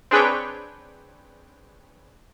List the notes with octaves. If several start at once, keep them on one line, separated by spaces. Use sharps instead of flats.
C4 D4 G#4 B4 C#5 G5